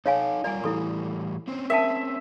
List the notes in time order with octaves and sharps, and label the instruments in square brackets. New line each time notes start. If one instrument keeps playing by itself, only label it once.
[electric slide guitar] D#4 A4 [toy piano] C#5 F5 G#5
[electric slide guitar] G3 F4 A#4 [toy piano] D5 G#5
[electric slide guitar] A2 E3 G3 [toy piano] E4 A4 C#6
[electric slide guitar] C4 C#4 C5
[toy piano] A#4 G5 A5 [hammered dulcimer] E5